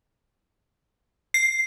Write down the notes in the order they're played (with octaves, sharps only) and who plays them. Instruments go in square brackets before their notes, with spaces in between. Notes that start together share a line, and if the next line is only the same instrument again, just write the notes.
[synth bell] C7